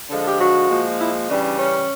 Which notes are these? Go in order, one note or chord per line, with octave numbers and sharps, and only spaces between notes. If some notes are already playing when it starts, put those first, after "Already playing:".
D3 F3 G#3 A4
G4
F#4
A#2 F3 G#3
E4
C#3 E3 G3 D4
D4
C#4